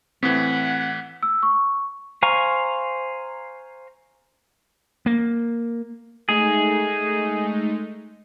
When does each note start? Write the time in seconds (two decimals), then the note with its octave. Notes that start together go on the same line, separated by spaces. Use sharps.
0.23 A2 E3 C4 F#5 B6
1.23 E6
1.43 C#6
2.23 C5 F5 G#5 A#5 C#6
5.06 A#3
6.29 G#3 A3 D#4 G#4